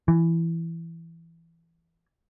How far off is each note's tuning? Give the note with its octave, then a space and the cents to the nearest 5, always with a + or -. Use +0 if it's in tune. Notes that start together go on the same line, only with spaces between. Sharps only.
E3 +10